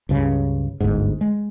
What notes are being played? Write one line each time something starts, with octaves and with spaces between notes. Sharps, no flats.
C#2 G2 C#3
G1 D2 G#2
G#3